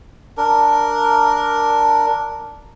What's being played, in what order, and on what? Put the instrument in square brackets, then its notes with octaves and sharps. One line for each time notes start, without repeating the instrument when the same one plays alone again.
[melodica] D4 A#4